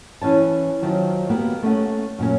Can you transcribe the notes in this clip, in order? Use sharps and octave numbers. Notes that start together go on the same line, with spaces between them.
E3 C#4 C#5 A5
D#3 F3 F#3
A#3 B3 F#4 G4
A3 C#4 F#5
F#2 A#2 A#3 C#4